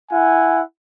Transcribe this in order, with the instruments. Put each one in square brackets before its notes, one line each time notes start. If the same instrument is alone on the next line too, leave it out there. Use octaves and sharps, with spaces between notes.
[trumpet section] E4 F#5 G#5